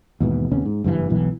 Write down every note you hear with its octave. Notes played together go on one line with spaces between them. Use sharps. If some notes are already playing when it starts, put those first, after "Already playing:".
D#2 G#2 B2 E3
D#2 C3 B3 C#4
G#2
F#1 G2 A#2 E3
E1 B1 E3